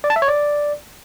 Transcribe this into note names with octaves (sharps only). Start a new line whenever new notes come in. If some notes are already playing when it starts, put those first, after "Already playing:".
D5
A5
E5
C#5
D5